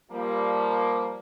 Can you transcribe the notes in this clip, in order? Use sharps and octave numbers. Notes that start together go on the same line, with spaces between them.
F3 G3 A#3